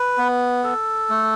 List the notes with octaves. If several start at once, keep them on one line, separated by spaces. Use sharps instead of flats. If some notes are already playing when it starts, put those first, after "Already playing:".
Already playing: B4
B3
A4
A3